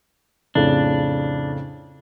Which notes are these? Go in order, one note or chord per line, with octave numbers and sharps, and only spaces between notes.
F2 A2 C#3 D4